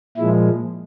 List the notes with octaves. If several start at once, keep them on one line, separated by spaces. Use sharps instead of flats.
A#2 F3 G#3 E4